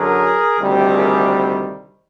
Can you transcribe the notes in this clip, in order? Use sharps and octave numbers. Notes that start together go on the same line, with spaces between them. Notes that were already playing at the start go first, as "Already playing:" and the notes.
Already playing: F#2 D3 F#3 G#4 A#4
D2 C3 D#3 G3
G#4 A#4